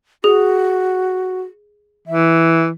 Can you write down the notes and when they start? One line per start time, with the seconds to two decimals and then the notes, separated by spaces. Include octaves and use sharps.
0.24 F#4 G#4
2.07 E3 E5